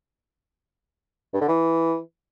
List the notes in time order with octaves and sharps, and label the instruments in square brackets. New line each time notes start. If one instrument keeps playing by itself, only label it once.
[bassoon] G2
D3
E3